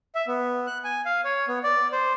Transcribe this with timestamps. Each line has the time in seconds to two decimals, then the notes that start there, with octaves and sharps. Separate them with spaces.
0.15 E5
0.27 B3
0.67 F#6
0.84 G#5
1.06 F5
1.24 C#5
1.48 B3
1.63 D5
1.92 C5